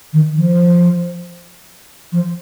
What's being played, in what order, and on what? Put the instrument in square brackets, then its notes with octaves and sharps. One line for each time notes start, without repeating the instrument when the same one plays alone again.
[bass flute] D#3
F3
F3